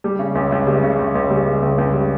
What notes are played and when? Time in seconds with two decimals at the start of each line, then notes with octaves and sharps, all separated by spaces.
0.04 G3
0.19 C#3
0.35 C#2
0.52 C#2
0.67 G3
0.83 C#3
0.99 C#2
1.15 C#2
1.30 G3
1.46 C#3
1.62 C#2
1.78 C#2
1.94 G3